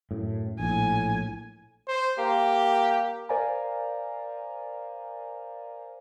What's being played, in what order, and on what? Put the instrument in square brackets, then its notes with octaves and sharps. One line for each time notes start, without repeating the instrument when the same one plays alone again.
[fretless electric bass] F#2 A2
[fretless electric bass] A#1 [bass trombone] A2 [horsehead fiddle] G#5
[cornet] C5
[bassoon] A#3 [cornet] G4
[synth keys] A#4 C5 D5 F5 G#5 A#5